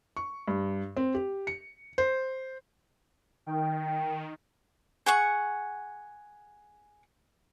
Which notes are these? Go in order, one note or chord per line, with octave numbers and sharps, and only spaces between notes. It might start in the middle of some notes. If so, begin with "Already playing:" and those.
C#6
G2
C4
G4
C#7
C5
D#3 G5
G#4 F#5 C#6